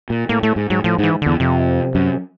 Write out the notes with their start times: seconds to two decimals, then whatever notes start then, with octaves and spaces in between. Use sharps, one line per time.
0.10 A#2
0.29 A2 A#3
0.43 A2 A3
0.56 G#2
0.70 G#2 F#3
0.84 A2 F3
0.98 G#2
1.03 E3
1.22 E2 D3
1.40 F2 C3
1.95 F#2